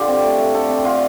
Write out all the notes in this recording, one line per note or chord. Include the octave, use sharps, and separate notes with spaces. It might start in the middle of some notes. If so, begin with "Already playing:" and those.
Already playing: D3 F4 G4
C4
A3
A3
D3 A4
C4
D3 F4